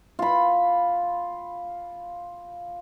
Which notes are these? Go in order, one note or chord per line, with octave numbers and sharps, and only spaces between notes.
F4 B5